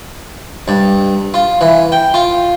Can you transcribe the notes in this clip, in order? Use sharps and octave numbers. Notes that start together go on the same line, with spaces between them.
G2
F4
E3
G5
F4